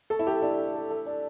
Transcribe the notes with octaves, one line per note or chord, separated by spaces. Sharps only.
A3 A4
E4
A3 G4
D4 E4
A4
A3
A3
D4